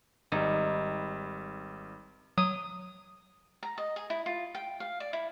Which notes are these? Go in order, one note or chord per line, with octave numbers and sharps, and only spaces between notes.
G#1 G3 D#4
F#3 D#6
A#5
D#5
G#4
E4
F4
G5
F5
D5
E4